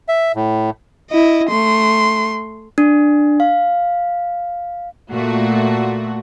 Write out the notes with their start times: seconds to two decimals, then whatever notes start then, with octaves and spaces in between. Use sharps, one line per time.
0.08 E5
0.35 A2
1.11 E4 D#5
1.50 A3 C6
2.78 D4
3.40 F5
5.11 A#2 A3 F#4